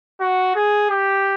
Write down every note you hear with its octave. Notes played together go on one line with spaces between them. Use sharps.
F#4
G#4
G4